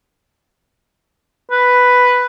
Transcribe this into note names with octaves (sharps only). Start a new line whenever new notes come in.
B4